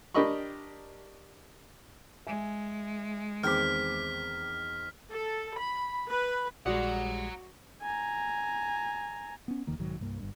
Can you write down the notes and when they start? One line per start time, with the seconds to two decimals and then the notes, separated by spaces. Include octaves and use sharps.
0.14 D4 G4 A#4 D#5 B5 C#6
2.27 G#3 E5 G#5
3.44 E2 D#3 C4 G5 D6 F6 B6
5.12 A4
5.57 B5
6.12 B4
6.66 A#1 G3 G#3 F#4 D5 F#5 A#5 D#6
7.82 G#5 A#5
9.48 B3 C#4
9.67 F1 D#2 D#3 A#3
9.79 B1 G#2 D#3 F#3
10.00 C2 G2 A#3
10.19 G1 G2